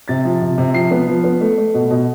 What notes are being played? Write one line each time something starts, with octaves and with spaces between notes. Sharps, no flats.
C3 A6
F3
C3
C3
F3 C7
B3
F3
B3
A3
A3
B2
B2